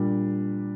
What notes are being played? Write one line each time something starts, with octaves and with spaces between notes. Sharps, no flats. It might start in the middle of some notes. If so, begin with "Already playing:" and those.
Already playing: A#2 G3 D4